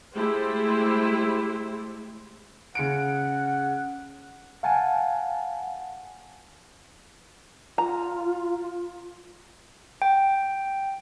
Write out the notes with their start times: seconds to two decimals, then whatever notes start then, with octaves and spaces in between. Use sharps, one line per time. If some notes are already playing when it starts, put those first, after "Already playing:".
0.14 G#3 A3 E4 G4 C5
2.75 C#3 F#5 C#7 D7
4.63 F5 F#5 G#5 A5
7.78 F4 A#5
10.02 G5